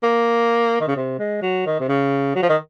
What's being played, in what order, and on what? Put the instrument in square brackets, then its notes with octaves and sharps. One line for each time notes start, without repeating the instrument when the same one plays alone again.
[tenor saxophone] A#3
D#3
C#3
C3
G#3
F#3
D#3
C3
C#3
F#3
F3
D#3